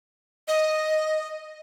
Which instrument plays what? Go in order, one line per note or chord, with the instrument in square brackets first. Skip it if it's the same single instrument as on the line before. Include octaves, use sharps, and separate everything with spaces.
[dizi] D#5